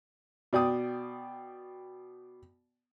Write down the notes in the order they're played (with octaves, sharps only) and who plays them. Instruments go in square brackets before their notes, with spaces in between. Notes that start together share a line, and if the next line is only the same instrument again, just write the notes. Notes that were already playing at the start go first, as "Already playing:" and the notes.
[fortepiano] B2 D5 G5 D#6